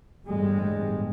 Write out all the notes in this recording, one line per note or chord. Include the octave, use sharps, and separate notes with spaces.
G1 E2 A2 G3 G#3